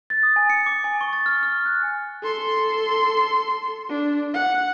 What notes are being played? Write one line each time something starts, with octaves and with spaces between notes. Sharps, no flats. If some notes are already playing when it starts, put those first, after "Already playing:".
A6
D#6
G#5
C#7
D6
G#5
C#6
A6
F6
F6
F#6
A4 C6
D4
F#5